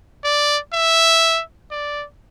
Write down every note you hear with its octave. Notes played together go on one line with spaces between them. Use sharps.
D5
E5
D5